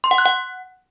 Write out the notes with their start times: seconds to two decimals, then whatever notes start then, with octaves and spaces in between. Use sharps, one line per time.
0.04 C6
0.11 F#5
0.18 F#6
0.26 F#5